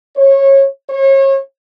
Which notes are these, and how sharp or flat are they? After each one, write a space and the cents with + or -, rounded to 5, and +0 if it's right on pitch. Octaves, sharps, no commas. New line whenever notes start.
C#5 -25
C#5 -35